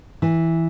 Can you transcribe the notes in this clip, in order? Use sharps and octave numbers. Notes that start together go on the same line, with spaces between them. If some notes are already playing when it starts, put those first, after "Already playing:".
E3